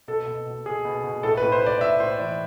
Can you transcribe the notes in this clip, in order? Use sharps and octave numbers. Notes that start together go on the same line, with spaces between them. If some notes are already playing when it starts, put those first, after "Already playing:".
B2 A4
B2
B2
B2 G#4
B2
B2
A2 A4
B4
A2
C5
A2 D5
A2 E5
A2 C5
E3 D5